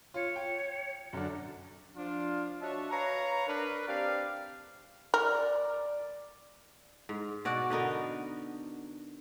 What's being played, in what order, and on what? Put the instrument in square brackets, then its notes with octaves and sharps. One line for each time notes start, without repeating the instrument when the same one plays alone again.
[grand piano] F4 [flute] C#5
[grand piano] G5
F#2 D3 D4
[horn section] F3 D4 F4
D4 F#4 C#5 D#5 E5 A5
B4 C#5 F5 A#5
D4 A#4 B4
C4 D4 G4 D5 F5
[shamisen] A#4 [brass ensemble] D5
[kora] G#2
B2 F#4 D5
D3 B3 D#4 A#4